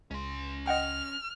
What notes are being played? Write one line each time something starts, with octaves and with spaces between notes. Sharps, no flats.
C#2 C#4 C6
D#5 F#5 G5 F6